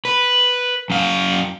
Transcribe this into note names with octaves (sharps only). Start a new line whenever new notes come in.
B4
F#2 F5